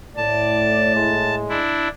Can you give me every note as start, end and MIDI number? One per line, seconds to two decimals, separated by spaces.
0.17 1.61 45
0.17 0.92 74
0.17 1.35 81
0.95 1.62 56
1.49 1.88 62
1.49 1.88 64